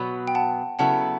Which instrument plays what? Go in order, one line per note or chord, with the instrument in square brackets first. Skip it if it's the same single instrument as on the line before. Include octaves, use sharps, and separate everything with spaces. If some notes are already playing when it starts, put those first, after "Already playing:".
Already playing: [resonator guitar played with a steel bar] B2 F#3 B3 [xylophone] B5
[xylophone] G5
F#5 A5
[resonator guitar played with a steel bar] C#3 F#3 B3 E4 A4 [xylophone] F#5 A5